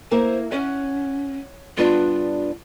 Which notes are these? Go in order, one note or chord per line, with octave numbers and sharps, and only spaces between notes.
A#3 E4 A#4 C5
C#4 C#5 F#5
G2 B3 D4 F4